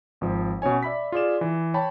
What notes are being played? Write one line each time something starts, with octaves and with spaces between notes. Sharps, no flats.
G#1 F3
B2 C#4 C#5 G#5
D5 E5 B5 B6
F4 G#4 D5 E7
E3
C#5 G5 A5 B5